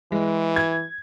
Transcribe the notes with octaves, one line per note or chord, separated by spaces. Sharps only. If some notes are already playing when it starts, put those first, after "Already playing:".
E3 G#3
G#6